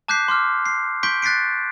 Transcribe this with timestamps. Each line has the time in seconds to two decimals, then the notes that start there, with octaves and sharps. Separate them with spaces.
0.08 A5 D6 F#6 G6 B6 C7
0.28 C6 D6 F6
0.66 C7
1.03 C6 C#6 G6 B6 D7
1.22 F#6 A6 B6 C7 D7